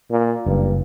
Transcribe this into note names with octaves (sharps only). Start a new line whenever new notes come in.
A#2
F#1 G2